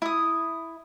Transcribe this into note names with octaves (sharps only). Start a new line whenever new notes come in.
E4 D#6